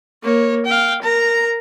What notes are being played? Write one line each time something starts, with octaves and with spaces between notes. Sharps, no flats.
A#3 C#5
F5 G5
A#4 A#5